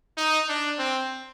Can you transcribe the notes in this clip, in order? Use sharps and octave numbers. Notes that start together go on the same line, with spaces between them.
D#4
D4
C4